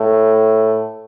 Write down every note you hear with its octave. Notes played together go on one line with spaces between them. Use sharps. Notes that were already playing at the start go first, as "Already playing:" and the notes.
Already playing: A2